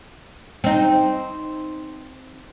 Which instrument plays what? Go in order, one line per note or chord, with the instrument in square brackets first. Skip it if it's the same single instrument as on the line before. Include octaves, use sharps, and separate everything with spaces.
[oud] C4 D#4